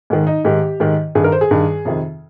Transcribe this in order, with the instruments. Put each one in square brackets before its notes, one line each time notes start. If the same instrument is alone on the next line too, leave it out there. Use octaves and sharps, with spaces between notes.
[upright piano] G#2 D#3
D#4
G#2 D#3 G4
G#2 D#3
G2 D#3 G#4
A#4
C5
G#4
G2 D#3
F2 C3 D#3